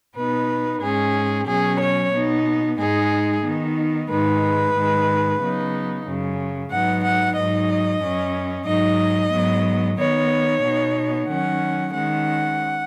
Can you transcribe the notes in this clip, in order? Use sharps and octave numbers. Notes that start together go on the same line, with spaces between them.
B2 B3 D#4 B4
G#2 G#3 C#4 G#4
B2 F#3 C#4 G#4
C#5
B2 B3 D#4
G#2 G#3 D#4 G#4
D#3 B3 D#4
G#2 D#3 G#3 D#4 B4
G#2 D#3 G#3
C#3 F#3 B3 D#4
F#2 C#3 F#3
G#2 F#3 B3 D#4 F#5
F#5
G#2 F#3 D#4 D#5
F#2 F#3 C#4
G#2 F#3 D#4 D#5
G#2 F#3 B3
D#3 B3 D#4 C#5
B2 B3 D#4
D#3 F#3 C#4 F#5
D#3 G#3 C#4 F#5